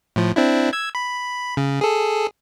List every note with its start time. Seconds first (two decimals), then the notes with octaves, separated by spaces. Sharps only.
0.16 A2 F3
0.36 C4 D4 E4
0.73 E6 G#6
0.95 B5
1.57 C#3
1.81 G#4 A4